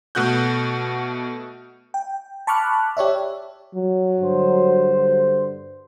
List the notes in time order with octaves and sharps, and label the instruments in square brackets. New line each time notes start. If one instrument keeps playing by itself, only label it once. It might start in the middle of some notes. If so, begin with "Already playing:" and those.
[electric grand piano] B2 A3 F#4 F#6 G6
[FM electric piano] G5
A5 B5 C#6 D6 F6 F#6
G4 C#5 D5 E5
[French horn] F#3
[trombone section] G2 D3 C5